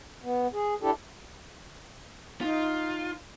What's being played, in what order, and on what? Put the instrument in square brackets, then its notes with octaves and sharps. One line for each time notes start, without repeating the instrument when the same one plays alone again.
[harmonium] B3
G#4
D4 E4 G4 A4
[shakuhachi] D#4 [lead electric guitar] F4